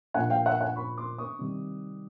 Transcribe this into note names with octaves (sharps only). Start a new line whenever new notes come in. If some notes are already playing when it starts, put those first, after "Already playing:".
A#2 F3 A#3 D4 F#5 G#5
F5 G5
E5 F#5
F#5 G#5
B5 C#6
C6 D6
C#6 D#6
C3 D#3 G3 C4 D#4